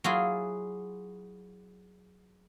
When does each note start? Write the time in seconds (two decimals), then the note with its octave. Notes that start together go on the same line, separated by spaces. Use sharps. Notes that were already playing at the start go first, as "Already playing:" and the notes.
0.04 F#3 E4 F4 G#4